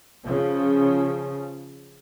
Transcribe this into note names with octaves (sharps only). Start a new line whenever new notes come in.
C#3 F3